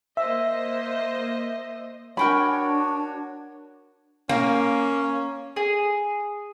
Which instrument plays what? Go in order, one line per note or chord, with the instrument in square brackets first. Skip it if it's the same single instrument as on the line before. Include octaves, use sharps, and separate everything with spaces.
[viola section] A#3 C5 D#5 [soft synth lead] E5
[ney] D4 [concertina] F#4 C#5 [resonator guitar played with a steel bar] A#4 G5 G#5 [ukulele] B5
[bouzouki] A#3 [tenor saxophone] C#4
[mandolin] G#4